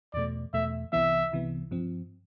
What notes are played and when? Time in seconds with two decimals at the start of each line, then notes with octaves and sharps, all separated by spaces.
0.14 E2 B2 A3 D5
0.53 E2 B2 A3 E5
0.93 C2 C3 E3 B3 E5
1.32 C2 C3 E3 B3
1.71 G2 F3 C4